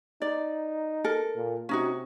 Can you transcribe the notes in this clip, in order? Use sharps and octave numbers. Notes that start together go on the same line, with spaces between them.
D#4 D5
A4 A#4
A#2
C3 C#4 D#4 F#4